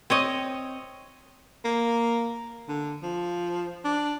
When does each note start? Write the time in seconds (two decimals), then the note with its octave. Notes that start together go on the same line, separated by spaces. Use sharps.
0.10 C4 C#5 D#5
1.65 A#3
2.68 D3
3.03 F3
3.85 D4